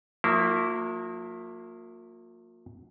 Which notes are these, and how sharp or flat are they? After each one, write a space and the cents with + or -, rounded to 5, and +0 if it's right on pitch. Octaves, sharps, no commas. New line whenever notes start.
F3 +45 A#3 -20 E4 +0